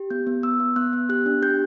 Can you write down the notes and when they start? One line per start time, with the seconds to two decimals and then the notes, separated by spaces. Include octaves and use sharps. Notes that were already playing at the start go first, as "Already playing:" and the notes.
Already playing: G4
0.10 B3 G6
0.27 B3
0.43 B3 E6
0.60 B3
0.76 B3 F#6
0.93 B3
1.09 G4 F#6
1.26 D4
1.42 G4 G6